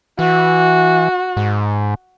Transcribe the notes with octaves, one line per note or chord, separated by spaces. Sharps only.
E3 F#4
G#2